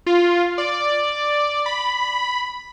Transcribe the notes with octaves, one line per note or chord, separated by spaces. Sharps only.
F4
D5
B5